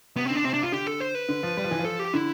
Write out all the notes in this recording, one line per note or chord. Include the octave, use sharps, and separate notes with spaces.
C3 B3
D3 C4
D4
C3 C4
D4
F4
D3 G4
A4
C5
B4
D3
F3
G3
F3
E3
F3
A4
G4
D3 E4